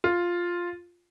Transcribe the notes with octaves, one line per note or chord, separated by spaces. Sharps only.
F4